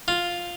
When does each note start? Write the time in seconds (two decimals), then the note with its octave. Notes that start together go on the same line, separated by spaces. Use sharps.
0.08 F4